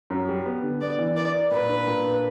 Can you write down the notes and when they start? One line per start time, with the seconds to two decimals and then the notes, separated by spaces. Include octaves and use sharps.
0.10 F#2
0.29 G3
0.46 B3
0.63 D3
0.81 B3 D5
0.99 E3
1.16 A#4 D5
1.34 A#4
1.51 A#2 B4
1.69 D4
1.87 A#2
2.05 D4